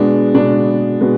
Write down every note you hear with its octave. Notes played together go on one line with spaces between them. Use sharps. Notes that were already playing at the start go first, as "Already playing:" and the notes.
Already playing: B2 G#3 B3 D4
B2 G#3 B3 D4
B2 G#3 B3